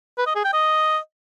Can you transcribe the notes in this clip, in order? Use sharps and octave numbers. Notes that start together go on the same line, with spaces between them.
B4
D#5
G#4
G5
D#5